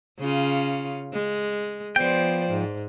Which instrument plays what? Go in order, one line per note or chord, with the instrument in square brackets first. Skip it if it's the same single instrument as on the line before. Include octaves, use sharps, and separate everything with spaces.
[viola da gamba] C#3 C#4 F4
G#3
[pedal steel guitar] F3 G5 [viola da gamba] B3 C5 D5
[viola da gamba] G#2